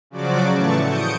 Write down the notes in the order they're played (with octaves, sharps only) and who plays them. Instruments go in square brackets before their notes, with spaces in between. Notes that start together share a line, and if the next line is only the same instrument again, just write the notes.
[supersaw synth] C#3 F3 F#3 F#4 D5 D6
A2 E3 A3 A5 C#6
D#6 G6 C#7 D7